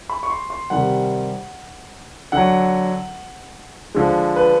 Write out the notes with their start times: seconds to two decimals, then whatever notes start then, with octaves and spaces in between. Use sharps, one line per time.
0.10 B5
0.23 C#6
0.30 C6
0.50 C6
0.70 C3 D#3 G3 F#5
2.32 D3 F#3 F#5
3.95 D3 F3 G#3
4.36 B4